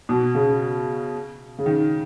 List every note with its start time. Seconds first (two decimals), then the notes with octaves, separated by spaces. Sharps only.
0.09 B2
0.35 C#3
1.58 C#3
1.66 D#3